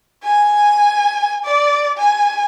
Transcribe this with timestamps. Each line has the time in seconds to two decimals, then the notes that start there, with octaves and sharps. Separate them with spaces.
0.24 G#5
1.44 D5
1.98 G#5